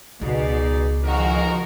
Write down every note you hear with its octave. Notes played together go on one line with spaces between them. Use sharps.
C#2 B2 D#4 G#4 D5
B1 D#3 F3 G#3 F#4 A#4